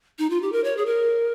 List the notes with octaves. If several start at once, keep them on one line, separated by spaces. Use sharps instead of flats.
D#4
F4
G4
A#4
C#5
G#4
A#4